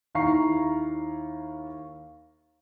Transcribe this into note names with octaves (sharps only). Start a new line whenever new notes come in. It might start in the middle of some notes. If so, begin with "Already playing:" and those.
D#2 E4 F5 A#5 C#6 C7